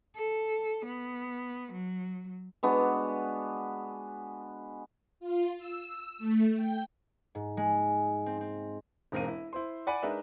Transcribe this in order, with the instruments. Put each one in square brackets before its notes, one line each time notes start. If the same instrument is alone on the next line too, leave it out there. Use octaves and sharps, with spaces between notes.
[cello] A4
B3
F#3
[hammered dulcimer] G#3 B3 D4 F#4
[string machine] F4
E6
A3
G5
[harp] G#2
G#3
C4
C4
[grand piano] E1 G#2 C4 A#4 F5 D#7
E4
E4 C5 C6
D5 F#5 G#5 B5
G#3 D4 D#4 A#4 B4 E5